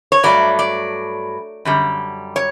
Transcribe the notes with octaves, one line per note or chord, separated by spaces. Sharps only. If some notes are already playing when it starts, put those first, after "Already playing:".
C#5
G2 F#3 A3 D5
D5
F#2 D3 G3
C#5